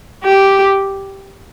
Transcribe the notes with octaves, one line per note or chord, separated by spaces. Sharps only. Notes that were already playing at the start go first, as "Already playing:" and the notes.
G4